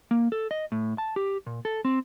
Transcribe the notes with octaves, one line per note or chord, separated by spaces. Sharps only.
A#3
A4
D#5
A2
A5
G4
A#2
A4
C4